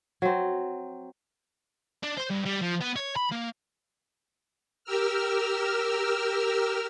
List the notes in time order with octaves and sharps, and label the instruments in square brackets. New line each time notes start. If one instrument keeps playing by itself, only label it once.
[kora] F#3 C4
[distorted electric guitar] D4
C5
G2
G3
F3
B3
C#5
B5
A#3
[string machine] G4 A#4 E6 F6